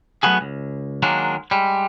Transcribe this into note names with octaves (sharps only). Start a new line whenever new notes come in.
F#3 A3 B3 F#4 G#4
C#2
D#3 F#3 G#3 A#3 D4
G3 G#3